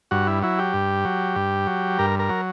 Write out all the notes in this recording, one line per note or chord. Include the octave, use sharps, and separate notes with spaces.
G2 F#4
E4
F#3 E4
G4
G2
F#3
G2
F#3
G2 A#4
A#4
F#3